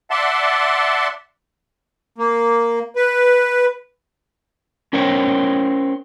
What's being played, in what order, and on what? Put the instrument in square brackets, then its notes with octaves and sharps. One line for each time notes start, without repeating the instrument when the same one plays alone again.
[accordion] D5 E5 F#5 A5 C6
A#3
B4
[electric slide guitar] C#4 A#4 C5 C#5 G5